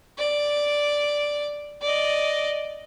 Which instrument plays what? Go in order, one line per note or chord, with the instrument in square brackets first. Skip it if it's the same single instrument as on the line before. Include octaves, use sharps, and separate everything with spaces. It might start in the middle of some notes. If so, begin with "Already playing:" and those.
[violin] D5
D5 D#5